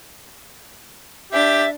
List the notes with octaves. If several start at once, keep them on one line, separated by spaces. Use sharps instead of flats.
D4 G4 E5 A6